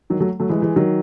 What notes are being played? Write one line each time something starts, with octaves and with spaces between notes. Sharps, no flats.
D#3 F#3
F#3 A3
F#3 A3
E3 G#3
E3 G#3
D#3 F#3